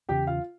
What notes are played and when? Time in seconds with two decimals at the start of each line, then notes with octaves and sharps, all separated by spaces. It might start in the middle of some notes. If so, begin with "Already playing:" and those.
0.09 E2 C#3 G4 G5
0.27 F4 F5